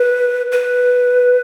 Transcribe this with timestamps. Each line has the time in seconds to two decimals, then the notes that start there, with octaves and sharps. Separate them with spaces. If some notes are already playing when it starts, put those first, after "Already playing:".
Already playing: B4
0.52 B4